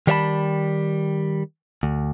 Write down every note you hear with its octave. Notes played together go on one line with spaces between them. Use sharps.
D#3 G3 C#5 E5 A5 B5
D2